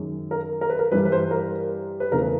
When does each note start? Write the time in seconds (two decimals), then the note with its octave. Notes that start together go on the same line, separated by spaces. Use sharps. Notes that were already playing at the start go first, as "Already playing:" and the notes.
Already playing: F#2 D#3 G#3
0.31 A#4
0.61 A#4
0.70 B4
0.79 A#4
0.92 G2 E3 G3 B4
1.05 B4
1.12 C5
1.31 A#4
2.00 B4
2.11 E2 C#3 E3 A3 A#4
2.22 B4